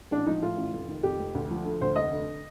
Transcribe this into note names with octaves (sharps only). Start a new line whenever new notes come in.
A1 D4
F3 D#4
A2 F4
A1
F1
D#3
F2 G4
F1
D2
F3
D3
D2 C5
F1 D#5
D3